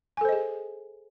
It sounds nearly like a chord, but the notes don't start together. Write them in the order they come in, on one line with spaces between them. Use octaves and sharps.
G#5 A4 C5 D#5 G#4